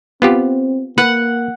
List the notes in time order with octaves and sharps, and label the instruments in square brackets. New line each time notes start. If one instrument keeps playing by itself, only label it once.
[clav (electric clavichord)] B3 F4 G4 [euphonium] C4
[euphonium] A#3 [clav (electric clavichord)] B4 [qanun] F#5